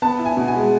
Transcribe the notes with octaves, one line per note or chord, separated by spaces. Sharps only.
B3 A5
E4
G#5
B2
G#5
G#3